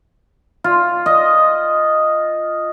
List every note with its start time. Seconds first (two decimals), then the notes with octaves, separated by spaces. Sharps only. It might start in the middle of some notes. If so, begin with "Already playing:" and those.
0.64 F4
1.06 D#5